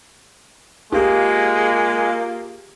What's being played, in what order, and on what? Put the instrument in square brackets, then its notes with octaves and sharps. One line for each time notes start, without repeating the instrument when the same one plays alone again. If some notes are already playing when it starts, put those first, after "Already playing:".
[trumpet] G#3 [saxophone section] A#3 F4 [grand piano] G4 G#4